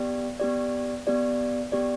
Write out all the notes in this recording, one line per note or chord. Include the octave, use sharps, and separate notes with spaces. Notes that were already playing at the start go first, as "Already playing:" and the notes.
Already playing: B3 G4 D5
B3 G4 D5
B3 G4 D5
B3 G4 D5